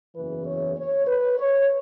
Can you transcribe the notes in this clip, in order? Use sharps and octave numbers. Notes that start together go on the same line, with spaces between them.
F#1 E2 E3 B4
C#5
C#5
B4
C#5